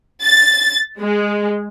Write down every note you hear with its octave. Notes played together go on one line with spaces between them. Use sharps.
A6
G#3